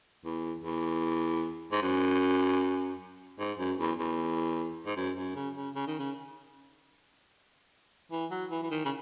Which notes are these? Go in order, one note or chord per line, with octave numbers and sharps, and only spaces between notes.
E2
E2
G#2
F#2
G#2
F#2
E2
E2
G#2
F#2
F#2
C#3
C#3
C#3
D#3
C#3
E3
F#3
E3
E3
D#3
C#3